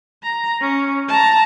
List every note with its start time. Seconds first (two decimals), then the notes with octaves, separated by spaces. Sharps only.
0.23 A#5
0.62 C#4
1.09 A5 A#5